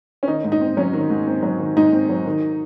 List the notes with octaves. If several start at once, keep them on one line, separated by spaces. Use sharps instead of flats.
C#4
D#3 D#4
G#2
D#4
C4
F#3 C#4
D#3
G#2
C4
F#3
D#3
G#2 D#4
C4
F#3
D#3